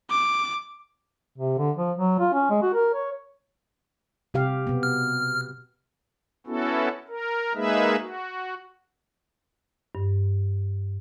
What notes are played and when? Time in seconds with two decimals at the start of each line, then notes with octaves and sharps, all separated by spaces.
0.10 D6
1.38 C3
1.58 D3
1.77 F3
1.97 F#3
2.20 F4
2.33 C#4
2.50 G#3
2.62 F#4
2.74 A#4
2.94 C#5
4.34 C3 G4 F5
4.67 B2 B3
4.83 F6
6.47 B3 C#4 E4 F#4 A4
7.09 A#4
7.55 G#3 A#3 D#4 G#4 B4 E5
8.00 F#4
9.95 G2